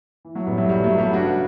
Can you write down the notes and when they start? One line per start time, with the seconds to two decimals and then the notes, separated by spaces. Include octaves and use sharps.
0.25 E3
0.35 F#3 A3
0.46 A1 G3 B3
0.58 F#3 A3
0.69 A1 G3
0.83 F#3 A3
0.91 G2
0.98 G3 B3
1.13 C#3 D4 F#4